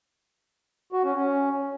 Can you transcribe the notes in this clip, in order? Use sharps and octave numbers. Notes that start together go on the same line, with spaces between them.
F#4
C#4
C#4